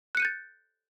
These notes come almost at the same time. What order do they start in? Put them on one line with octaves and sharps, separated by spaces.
F#6 C#7 D#7 G6 A6